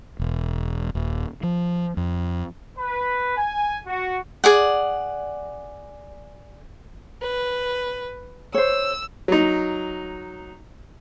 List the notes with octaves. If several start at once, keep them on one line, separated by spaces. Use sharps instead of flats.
E1
D#1
F3
F2
B4
G#5
F#4
G#4 D5 F#5
B4
C5 C#5 E6
F#3 D#4